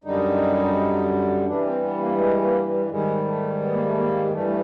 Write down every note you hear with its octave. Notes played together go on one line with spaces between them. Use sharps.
F#2 D3 G3 D#4
G2 E3 G3 D4
C4
B3
A#3
G#3
A#3
G3
G#2 D#3 G3 G#3
A3
B3
A#3
A3
A#3
G2 E3 G3 A3
A3